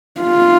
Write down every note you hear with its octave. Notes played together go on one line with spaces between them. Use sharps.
F4